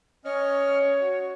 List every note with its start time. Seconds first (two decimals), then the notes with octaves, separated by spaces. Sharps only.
0.25 C#4 C#5 D#5 F6
1.01 F#4